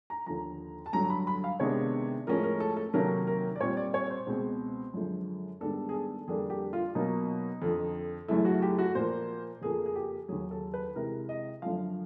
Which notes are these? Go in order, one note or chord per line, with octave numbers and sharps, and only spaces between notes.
A#5
D#2 D3 F3 A#5
A5
G2 D3 F#3 A#5
B5
B5
F5
C3 D#3 G#3 B3 D4 C#5
A2 F3 G#3 C#4 A#4
A#4
A4
A4
C3 D#3 F#3 A#3 C#4 A#4
A#4
D5
A#2 G3 C4 C#5
D5
C#5
C5
C#2 B2 G#3 C4
F#2 D3 F3 G#3
G#2 D#3 G3 B3 D4 A4
G#4
A4
F2 D3 G3 A#3 D4 G#4
G4
F4
B2 F#3 A#3 C#4 D#4
F2 D3 F3
F#2 C#3 E3 A3 E4
F#4
G4
F#4
A#2 F3 A#3 C5
F2 C#3 F3 A#3 G#4
G#4
G4
D#2 C#3 F#3 G#4
A4
B4
C3 E3 G#3 A#4
D#5
F#2 D3 F3 F5